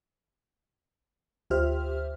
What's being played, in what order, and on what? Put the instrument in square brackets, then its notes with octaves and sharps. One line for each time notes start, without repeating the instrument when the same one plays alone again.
[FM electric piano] D2 F4 G4 C5 E5 F6